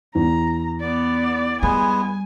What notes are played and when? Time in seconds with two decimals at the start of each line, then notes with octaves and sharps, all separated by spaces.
0.15 E2 A#5
0.80 B3 D5
1.63 G3 G#3 B3 G#5